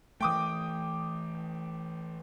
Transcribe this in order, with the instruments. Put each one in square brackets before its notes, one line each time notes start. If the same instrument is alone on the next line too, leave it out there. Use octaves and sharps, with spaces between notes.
[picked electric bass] E3 A3 [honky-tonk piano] G5 D6 D#6